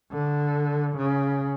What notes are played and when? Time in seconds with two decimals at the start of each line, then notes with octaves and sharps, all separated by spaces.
0.12 D3
0.97 C#3